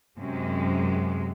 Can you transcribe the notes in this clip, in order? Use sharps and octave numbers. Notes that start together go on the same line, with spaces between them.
F#2 C3 G#3